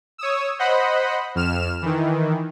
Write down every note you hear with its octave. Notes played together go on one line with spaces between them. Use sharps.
C#5 D#6 E6
C5 D#5 F#5 B5
F2 F6 E7
D#3 E3